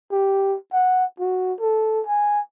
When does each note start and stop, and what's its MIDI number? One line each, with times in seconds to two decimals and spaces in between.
0.12 0.57 67
0.73 1.05 78
1.20 1.54 66
1.61 2.02 69
2.07 2.40 80